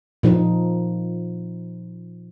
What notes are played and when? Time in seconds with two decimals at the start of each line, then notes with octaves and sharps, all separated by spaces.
0.23 A#2 F3 D#4